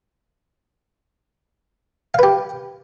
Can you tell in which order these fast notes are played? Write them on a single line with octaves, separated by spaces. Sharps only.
F5 B4 G4